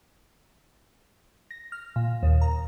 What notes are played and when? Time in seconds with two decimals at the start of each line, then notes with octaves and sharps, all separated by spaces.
1.51 A#6
1.72 F6
1.96 A#2
2.23 D#2
2.41 A#5